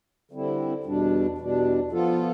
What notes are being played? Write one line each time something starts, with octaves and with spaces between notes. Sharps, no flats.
D3 G3 C4 E4
E2 B2 G3 D4
E2 B2 G3 D4
F3 B3 F4 A4